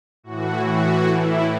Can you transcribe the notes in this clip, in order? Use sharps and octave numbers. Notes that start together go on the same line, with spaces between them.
A2 E3 F#4
F#4
E4